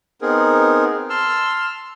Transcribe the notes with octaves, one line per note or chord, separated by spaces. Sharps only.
B3 C4 D#4 G#4 A#4
A5 C6 E6 F6